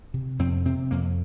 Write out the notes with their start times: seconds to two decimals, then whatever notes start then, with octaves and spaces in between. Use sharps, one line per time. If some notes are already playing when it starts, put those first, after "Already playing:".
0.14 C3
0.39 F2 C4
0.65 C3 C4
0.91 F2 A#3